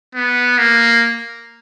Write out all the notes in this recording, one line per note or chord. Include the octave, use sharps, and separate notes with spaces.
B3
A#3